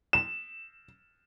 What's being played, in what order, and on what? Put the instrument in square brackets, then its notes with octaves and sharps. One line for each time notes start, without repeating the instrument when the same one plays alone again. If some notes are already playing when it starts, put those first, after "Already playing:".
[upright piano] E7